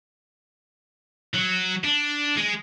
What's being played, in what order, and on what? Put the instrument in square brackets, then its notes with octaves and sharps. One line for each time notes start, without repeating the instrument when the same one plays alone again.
[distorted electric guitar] F#3
D4
G#3